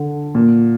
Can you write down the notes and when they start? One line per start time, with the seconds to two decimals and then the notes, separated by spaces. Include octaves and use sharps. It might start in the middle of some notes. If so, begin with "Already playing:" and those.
Already playing: D3
0.35 A#2